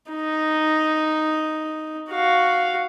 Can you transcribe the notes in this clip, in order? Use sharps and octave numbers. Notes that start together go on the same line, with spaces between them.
D#4
F#4 F5